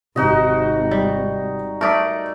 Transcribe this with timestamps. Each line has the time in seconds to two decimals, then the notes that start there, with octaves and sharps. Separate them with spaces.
0.16 G#1 C3 D#4 F#4 D#5
0.91 G3
1.81 A3 A#4 D5 C#6 D#6 B6